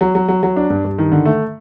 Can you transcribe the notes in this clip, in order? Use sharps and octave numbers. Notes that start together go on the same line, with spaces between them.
F#3
F#3
F#3
F#3
D4
G2
G2
D#3
D3
A3